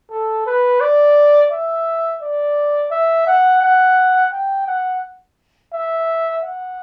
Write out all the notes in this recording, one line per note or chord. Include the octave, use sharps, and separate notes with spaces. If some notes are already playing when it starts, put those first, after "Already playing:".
A4
B4
D5
E5
D5
E5
F#5
F#5
G5
F#5
E5
F#5